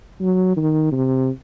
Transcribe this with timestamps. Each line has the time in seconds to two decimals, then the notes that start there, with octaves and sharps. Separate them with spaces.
0.21 F#3
0.57 D#3
0.92 C3